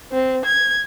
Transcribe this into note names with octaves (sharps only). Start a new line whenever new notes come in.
C4
G#6